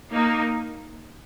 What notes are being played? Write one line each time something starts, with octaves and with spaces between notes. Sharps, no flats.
A#3 D#4